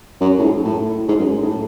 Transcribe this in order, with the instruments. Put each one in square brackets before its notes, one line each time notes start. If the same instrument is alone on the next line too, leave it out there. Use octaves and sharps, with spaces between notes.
[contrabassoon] F#2
A2
G#2
A2
G#2
F#2
G#2
A2